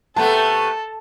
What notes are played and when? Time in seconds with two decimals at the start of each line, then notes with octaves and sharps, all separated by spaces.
0.16 C3 A3 B3 A4 A5